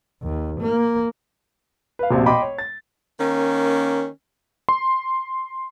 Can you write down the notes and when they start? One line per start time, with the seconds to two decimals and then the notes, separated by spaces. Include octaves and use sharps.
0.23 D#2
0.60 A#3
1.99 B4 F5
2.11 E1 A#1 C3
2.26 D#5 G5 B5 C6 D6
2.42 C#5
2.58 A6
3.20 D#3 A#3 C#4
4.69 C6